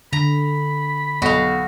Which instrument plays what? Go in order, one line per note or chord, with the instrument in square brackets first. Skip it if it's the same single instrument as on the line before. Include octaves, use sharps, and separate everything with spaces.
[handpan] D3 [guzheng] A#5 [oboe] B5
[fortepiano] B1 [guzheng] F#4 F5